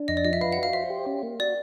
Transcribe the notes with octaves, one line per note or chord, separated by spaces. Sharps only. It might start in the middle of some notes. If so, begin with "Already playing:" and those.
Already playing: D4
F2 D#5
D5
F3 D#5
E5
B4 F5
F#5
F#4
F5
C5 E5
G4
C#4
A#3
F#4 D5